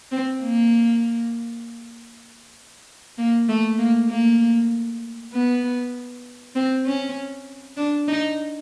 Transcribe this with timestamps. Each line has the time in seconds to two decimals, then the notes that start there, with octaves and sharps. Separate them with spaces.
0.12 C4
0.42 A#3
3.18 A#3
3.49 A3
3.78 A#3
4.10 A#3
5.33 B3
6.55 C4
6.86 C#4
7.77 D4
8.08 D#4